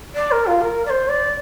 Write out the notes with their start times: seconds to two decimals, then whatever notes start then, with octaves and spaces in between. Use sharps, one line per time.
0.15 D5
0.31 A#4
0.46 F4
0.61 A#4
0.86 D5
0.90 C5
1.08 D5